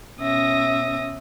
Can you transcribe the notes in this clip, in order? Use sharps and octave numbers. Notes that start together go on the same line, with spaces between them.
B2 C#4 E5 D#6 A#6